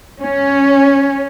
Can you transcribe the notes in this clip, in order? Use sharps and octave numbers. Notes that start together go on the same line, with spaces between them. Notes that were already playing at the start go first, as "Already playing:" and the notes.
C#4